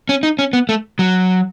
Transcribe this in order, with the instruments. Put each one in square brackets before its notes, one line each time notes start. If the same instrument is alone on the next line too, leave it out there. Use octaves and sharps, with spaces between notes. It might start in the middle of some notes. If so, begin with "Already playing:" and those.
[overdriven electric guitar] C#4
D#4
C#4
B3
A3
F#3